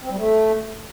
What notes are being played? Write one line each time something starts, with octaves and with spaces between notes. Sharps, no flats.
C4
G3
A3